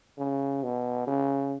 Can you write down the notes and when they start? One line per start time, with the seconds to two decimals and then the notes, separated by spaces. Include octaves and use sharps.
0.18 C#3
0.63 B2
1.08 C#3